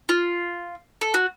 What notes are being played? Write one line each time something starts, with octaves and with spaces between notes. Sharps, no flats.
F4
A4
F#4